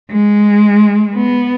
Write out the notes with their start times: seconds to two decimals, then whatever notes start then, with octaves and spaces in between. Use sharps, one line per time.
0.12 G#3
1.16 B3